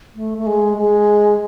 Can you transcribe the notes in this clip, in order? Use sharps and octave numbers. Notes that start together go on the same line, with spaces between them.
A3
A3
G#3
G#3